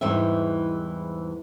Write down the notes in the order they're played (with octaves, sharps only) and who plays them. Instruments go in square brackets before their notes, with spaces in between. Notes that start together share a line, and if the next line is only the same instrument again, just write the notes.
[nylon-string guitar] E2 G#2 E3 G3 E5